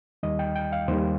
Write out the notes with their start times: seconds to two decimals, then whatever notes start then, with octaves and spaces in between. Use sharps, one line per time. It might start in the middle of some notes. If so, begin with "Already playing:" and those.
0.23 D#2 D#3 G3 D#5
0.39 G5
0.55 G5
0.72 F5
0.88 D#2 D#3 G3 C5